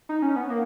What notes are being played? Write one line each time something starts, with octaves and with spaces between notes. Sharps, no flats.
D#4
C#4
B3
A#3